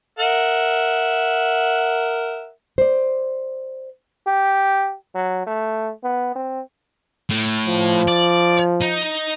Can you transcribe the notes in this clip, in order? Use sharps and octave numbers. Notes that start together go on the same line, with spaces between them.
A#4 E5 F#5
C5 D5
G4
F#3
A3
B3
C4
A2
F3
D5
D#4